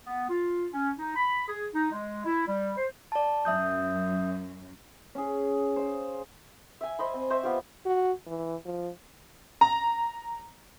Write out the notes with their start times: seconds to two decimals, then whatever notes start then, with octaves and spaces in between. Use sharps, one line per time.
0.05 B3
0.29 F4
0.72 C#4
0.98 D#4
1.15 B5
1.48 G#4
1.74 D#4
1.91 G#3
2.25 E4
2.47 G3
2.76 C5
3.12 D5 A5
3.45 F#2 E5 D#6 G6
5.15 C#4 G#4
5.76 C5 F5
6.81 E5 G#5
6.99 C5 D#5 B5
7.14 C4
7.30 C5 D#5 E5 C#6
7.43 B3 F4 G4
7.86 F#4
8.27 E3
8.65 F3
9.61 A#5